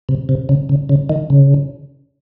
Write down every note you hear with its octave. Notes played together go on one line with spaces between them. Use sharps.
C3
C3
C#3
C#3
C#3
D#3
C#3